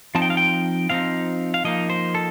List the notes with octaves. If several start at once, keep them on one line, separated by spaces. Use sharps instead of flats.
F3 C4 D#4 A5
G5
F5
G5
F3 C4 D#4 F5
F5
F3 A#3 D#4 D#5
C5
A4